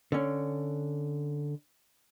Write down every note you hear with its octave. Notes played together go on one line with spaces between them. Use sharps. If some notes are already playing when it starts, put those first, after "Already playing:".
D3 C#4